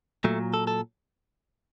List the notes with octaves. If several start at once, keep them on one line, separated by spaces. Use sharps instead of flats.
A#2 F#3 A3
A4
A4